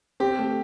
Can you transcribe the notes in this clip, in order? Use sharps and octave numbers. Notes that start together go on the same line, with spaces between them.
C4 G4
A3